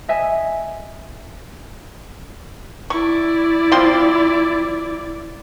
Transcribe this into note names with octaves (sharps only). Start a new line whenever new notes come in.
D#5 E5 G#5
E4 D5 C#6
F3 C4 C6